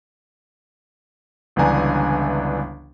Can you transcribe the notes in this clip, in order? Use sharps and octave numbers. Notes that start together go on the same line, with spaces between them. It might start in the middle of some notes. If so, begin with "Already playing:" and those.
G1 C#2 E3 D4 G#5 A#5